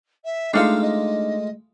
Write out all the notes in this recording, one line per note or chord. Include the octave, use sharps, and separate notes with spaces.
E5
G#3 A3 D4 D#4 F4 F5 F6
D#5